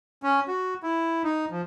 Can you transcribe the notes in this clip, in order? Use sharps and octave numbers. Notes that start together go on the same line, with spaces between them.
C#4
F#4
E4
D#4
F3